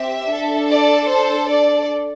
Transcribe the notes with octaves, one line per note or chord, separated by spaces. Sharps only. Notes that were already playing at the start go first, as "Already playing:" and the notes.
Already playing: C4 G4 E5
D4 A4
D5
C5
D5